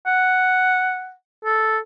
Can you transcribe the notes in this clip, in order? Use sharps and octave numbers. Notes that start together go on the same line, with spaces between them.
F#5
A4